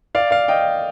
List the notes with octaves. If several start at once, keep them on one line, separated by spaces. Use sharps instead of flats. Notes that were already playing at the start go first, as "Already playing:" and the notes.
D5 F5
D5 F5
D#5 G5